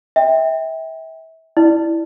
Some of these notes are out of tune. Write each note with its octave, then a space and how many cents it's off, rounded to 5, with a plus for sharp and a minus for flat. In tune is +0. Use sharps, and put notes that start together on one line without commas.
E5 -30 G5 +20
E4 +0 D5 +10